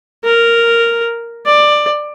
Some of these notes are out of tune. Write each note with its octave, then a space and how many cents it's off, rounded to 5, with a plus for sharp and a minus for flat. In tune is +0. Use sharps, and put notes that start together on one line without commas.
A#4 -5
D5 +15